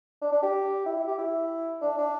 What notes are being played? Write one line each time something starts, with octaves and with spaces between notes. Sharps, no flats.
D4
D4
G4
E4
E4
G4
E4
D4
D4